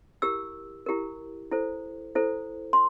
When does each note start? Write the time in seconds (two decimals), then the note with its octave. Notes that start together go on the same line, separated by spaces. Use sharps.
0.22 E4 G4 A#4 E6
0.86 E4 G4 A#4
1.51 E4 A4 C5
2.15 E4 A4 C5
2.73 C6